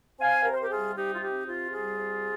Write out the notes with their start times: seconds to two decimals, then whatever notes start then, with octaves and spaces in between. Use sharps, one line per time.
0.19 C4 F5 G#5
0.44 C3 A#4
0.52 C5
0.61 G4 A#4
0.70 G3 F4 G#4
0.95 C3 D#4 G4
1.14 F4
1.21 C4 D#4 G4
1.46 C3 F4
1.72 G3 F4 G#4
1.98 C3